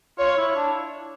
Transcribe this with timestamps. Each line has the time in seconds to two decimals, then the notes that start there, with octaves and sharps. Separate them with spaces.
0.18 F4 C#5
0.37 E4
0.56 D4